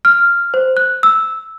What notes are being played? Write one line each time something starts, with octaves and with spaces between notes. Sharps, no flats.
F6
C5
F#6
E6